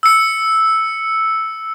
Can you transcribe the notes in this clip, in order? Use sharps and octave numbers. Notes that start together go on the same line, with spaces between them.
E6 C#7